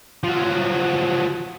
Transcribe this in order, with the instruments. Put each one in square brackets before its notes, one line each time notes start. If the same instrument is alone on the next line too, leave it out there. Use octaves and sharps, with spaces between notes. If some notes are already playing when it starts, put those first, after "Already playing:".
[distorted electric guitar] F3 F#3